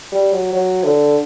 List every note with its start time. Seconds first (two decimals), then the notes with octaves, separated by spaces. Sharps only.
0.12 G3
0.32 F#3
0.52 F#3
0.84 D3